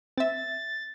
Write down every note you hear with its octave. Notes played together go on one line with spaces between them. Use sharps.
C4 E5 A6